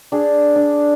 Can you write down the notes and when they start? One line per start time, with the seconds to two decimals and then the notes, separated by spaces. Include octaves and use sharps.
0.12 D4 G#4
0.56 D4